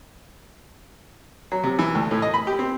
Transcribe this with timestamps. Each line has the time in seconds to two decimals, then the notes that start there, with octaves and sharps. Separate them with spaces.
1.52 F#3
1.64 C3
1.79 E3
1.95 D2
2.11 A2
2.22 D#5
2.34 B5
2.47 G4
2.59 C4